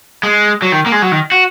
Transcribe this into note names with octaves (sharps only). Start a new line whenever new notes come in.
G#3
F#3
D#3
A#3
G#3
F#3
D#3
F#4